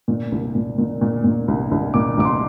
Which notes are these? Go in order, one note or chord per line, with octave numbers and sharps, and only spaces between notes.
A#2
C2
A#2
A#2
A#2
A#2
C2
C2
A#2 D6
C2 D6
C6